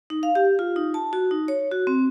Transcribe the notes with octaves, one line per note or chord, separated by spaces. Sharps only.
D#4
F5
G4
F4
D#4
A5
F#4
D#4
C#5
F#4
C4